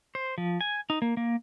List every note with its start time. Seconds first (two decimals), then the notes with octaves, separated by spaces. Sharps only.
0.15 C5
0.38 F3
0.61 G#5
0.90 D#4
1.02 A#3
1.17 A#3